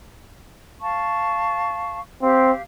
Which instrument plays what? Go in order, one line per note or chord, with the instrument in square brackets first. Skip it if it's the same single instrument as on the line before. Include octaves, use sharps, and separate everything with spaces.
[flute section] F5 A5 C#6
[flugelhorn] C4 [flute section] G4 F5